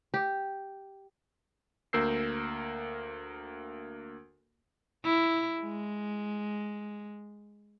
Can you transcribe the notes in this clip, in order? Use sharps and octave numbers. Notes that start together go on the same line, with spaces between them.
G4
D2 A#3 A#4 E6 G6 C7
E4
G#3